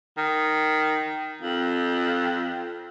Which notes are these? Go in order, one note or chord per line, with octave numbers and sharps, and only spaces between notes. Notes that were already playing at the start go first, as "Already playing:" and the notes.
D#3
F2